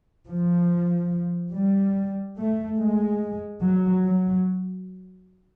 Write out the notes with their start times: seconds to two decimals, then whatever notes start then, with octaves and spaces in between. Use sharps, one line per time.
0.27 F3
1.52 G3
2.36 A3
2.78 G#3
3.62 F#3
4.04 F#3